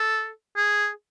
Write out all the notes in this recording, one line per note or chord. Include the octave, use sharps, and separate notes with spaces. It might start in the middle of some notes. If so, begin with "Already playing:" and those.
Already playing: A4
G#4